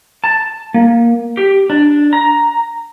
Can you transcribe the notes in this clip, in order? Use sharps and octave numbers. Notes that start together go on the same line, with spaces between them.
A5
A#3
G4
D4
A#5